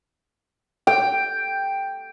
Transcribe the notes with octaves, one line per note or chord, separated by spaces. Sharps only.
G5